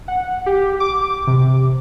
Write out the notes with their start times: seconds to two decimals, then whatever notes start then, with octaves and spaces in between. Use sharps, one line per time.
0.08 F#5
0.46 G4
0.80 D6
1.27 C3